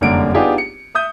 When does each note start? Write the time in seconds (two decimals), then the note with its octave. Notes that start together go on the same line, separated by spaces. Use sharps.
0.01 F1 F#2 D3 G3 A#3 D7
0.34 B3 D4 D#4 F4 G4 G#4
0.58 C#7
0.95 E5 D#6 G6